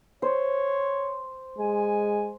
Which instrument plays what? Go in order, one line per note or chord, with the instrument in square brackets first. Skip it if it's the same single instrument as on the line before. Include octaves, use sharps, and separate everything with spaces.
[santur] C5 [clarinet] C#5
[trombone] G#3 [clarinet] G#5